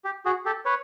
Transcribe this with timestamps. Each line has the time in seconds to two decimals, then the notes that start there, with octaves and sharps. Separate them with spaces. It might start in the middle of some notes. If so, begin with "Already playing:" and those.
0.05 G4
0.25 F#4 G#4
0.45 G4 A4
0.65 B4 C#5